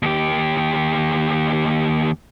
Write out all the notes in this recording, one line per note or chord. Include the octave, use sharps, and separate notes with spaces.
D#2 G4